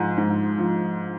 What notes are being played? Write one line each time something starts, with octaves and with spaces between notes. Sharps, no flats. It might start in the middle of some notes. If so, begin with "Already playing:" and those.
Already playing: G#2 F3 G#3 A#5
G#2
F3